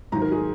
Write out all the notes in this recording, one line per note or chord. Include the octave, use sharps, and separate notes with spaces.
G#2 D#3 F#3 A#5
A#4
G#4